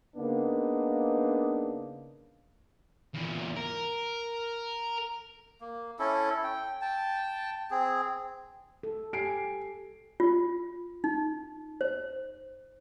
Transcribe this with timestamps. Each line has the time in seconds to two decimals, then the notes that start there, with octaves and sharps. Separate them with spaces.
0.17 C#3 A#3 B3 D4 D#4
3.15 E2 A#2
3.56 A#4
5.61 A#3
5.99 C#4 E4 A4
6.44 G5
6.81 G5 A5
7.71 C4 G#4
8.83 A4
9.13 G4 G#5 C7 D7
10.20 F4
11.04 D#4
11.81 C5